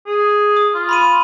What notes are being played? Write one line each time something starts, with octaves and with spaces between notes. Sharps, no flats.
G#4
D#6
F4
B5 C6 D#7